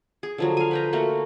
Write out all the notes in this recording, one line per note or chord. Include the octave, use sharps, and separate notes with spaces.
G#4
D3 F3 F#3
F5 G#5
B4 G5 A#5
A3 A#3 F#4